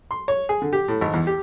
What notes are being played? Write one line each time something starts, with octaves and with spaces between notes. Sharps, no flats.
C6
C#5
G#4
D3
G4
A2
G#1
E2
G4